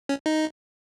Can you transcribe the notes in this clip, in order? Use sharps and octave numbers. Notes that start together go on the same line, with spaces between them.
C#4
D#4